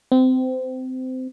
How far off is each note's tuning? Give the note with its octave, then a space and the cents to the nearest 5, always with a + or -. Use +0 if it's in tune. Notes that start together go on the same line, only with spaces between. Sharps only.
C4 -25